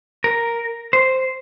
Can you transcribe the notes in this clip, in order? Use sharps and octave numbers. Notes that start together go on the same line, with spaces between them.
A#4
C5